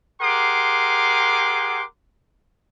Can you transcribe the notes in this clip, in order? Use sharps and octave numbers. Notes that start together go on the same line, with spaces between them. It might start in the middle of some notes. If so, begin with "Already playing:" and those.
G4 G#4 A#4 F#5 C6 D6